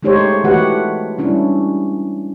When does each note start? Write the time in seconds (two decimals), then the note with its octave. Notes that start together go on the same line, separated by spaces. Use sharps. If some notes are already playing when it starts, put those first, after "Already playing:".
0.03 G#3 A3 D#4 G4 C5 C#5
0.44 E3 A3 F#4 G4 B4 F#5
1.18 G3 C#4 D4 E4